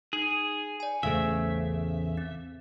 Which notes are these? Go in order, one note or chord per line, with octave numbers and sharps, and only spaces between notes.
D#4 G#4
D5 G#5
A1 E2 C#3 A3 G#4 C5 E5 F5
C4